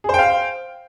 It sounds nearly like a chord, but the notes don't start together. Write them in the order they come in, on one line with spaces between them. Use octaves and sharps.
G#4 C5 G5 F5